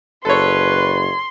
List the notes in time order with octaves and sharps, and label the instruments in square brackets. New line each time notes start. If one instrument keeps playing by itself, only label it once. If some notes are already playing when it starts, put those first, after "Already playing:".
[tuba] F#1 [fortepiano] A4 C#5 [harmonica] B4 [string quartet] C6